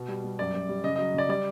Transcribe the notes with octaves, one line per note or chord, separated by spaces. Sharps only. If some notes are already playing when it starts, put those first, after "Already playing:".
Already playing: B2
G3
G3
F#2 D5
F#2
G3
C#3 D#5
F#3 D#5
C#3 D5
G3 D5